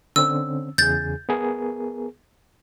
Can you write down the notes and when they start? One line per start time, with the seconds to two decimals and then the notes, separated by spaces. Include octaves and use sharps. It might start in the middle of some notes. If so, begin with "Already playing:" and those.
0.16 D3 C4 C#4 E6
0.78 E2 C#3 G#4 G6 A6
1.29 B3 G#4 A#4